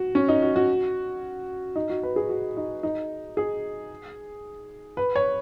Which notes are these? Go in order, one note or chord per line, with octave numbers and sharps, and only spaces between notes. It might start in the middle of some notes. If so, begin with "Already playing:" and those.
Already playing: F#4
C#4
D#4
F#4
F#4
D#4
F#4
B4
G#4
F#4
D#4
D#4
G#4
B4
C#5